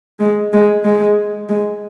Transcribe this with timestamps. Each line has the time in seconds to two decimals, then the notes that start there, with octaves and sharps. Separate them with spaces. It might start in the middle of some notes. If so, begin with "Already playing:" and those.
0.20 G#3
0.53 G#3
0.84 G#3
1.49 G#3